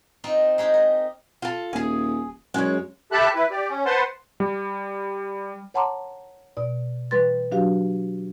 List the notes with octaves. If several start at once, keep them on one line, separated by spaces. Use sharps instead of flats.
C4 D#4 F4
G#3 D#4 G4
A#4
F4 A4
D#1 G#4 G#5
F#2 G#3 C#5
G4 A4 E5 A5 B5 F#6
E4 B4
G4 D5
C#4
B4 C5 F#5 A5 C6
G3
C#5 F#5 A5 A#5 C6 D6
B2 D5
E3 G3 B4 C6 A6
F#3 D4 F#4 G4 F5